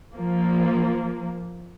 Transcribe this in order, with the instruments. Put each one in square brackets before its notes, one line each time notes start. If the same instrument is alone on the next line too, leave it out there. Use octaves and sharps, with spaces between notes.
[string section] F3 A#3